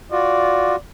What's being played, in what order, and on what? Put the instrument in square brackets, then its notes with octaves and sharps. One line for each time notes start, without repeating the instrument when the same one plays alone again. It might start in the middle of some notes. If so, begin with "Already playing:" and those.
[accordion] F4 F#4 [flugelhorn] D5